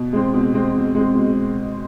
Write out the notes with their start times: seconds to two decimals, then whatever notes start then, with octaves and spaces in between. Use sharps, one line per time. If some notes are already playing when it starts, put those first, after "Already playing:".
Already playing: B2
0.13 G#3 C4
0.34 B2
0.54 G#3 C4
0.74 B2
0.95 G#3 C4
1.15 B2